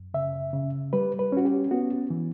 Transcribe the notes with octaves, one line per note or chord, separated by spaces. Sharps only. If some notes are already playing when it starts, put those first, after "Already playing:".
Already playing: F#2
C#3 E5
C#3
G3 B4
B4
C#4 F#4
G4
B3 F#4
E3